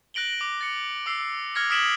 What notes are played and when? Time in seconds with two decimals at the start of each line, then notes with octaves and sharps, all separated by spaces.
0.14 F#6 A#6 D7 F#7 G7
0.41 D6
0.61 A6 C#7
1.06 D6 E6 C7
1.55 D6 F6 G#6 A#6 C#7
1.70 D#6 F6 B6 D7 E7 F#7